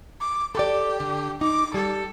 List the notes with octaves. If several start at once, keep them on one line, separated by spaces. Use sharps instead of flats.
D6
G4 A4 D5
D3
D#4 D6
G3 A4